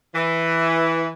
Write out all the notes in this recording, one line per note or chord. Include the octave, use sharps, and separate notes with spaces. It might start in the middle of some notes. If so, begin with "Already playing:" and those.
E3